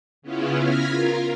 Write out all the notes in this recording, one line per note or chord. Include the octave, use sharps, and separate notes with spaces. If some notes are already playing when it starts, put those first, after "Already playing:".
C#3 B3 C#4 E4 F4
F6 G#6 A#6 B6
F4 A#4